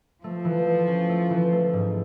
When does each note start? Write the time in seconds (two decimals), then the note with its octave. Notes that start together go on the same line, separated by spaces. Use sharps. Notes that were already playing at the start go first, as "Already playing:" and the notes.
0.23 F3 A3
0.45 E3
0.67 A3
0.88 C#4
1.09 A3
1.30 E3
1.52 A3
1.73 G#2